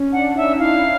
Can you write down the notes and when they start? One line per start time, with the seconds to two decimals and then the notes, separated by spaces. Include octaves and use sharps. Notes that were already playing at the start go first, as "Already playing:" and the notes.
Already playing: C#4
0.12 D4 F#5
0.35 C#4 D#4 E5
0.59 D4 E4 F5